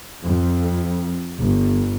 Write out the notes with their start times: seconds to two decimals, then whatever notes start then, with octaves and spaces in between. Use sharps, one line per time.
0.24 F2
1.39 G1